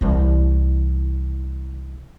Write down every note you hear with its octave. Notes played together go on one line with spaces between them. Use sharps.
C2 E3